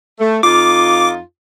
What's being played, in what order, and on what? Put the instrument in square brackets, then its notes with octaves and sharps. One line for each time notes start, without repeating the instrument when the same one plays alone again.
[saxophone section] A3
[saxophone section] F2 D#4 F4 [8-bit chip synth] D6